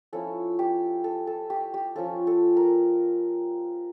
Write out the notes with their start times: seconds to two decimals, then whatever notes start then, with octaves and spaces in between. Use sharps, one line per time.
0.13 F3 C#4 E4 A4
0.59 G4
1.04 A4
1.27 A4
1.50 G4
1.74 G4
1.96 F3 C#4 F4 A4
2.27 A4
2.57 A#4